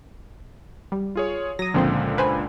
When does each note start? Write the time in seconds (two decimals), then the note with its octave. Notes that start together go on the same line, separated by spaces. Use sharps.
0.92 G3
1.16 F4 G#4 C#5
1.59 F#3 D#6 A#6
1.74 C#2 A#2 D3 F3 C4 C5
2.18 B4 C5 G#5